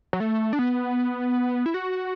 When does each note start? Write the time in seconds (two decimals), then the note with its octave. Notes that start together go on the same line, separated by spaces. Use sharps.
0.13 F#3
0.20 A3
0.53 D4
0.59 B3
1.66 E4
1.74 F#4